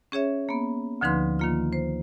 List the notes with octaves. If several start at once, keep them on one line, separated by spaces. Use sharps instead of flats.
C#4 G#4 C#5 E5
A#3 B3
D2 D3 F3 D#4 B4 C6
D#3 A#3 F4
C5